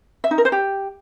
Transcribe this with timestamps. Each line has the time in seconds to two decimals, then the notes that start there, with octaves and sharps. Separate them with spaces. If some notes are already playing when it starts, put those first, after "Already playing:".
0.24 E5
0.31 D#4
0.38 A#4
0.45 C5
0.52 G4